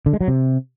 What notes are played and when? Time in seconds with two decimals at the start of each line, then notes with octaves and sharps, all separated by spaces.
0.06 D3
0.13 G#3
0.21 F#3
0.28 C3